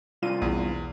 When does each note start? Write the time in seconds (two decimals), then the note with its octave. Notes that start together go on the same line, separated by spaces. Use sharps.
0.23 C2 F4 D5 D#7
0.42 B1 E2 B2